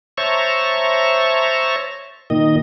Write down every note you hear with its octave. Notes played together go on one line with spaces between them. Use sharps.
C5 C#5 E5 A5 A#5 C#6
A#2 D#3 D#5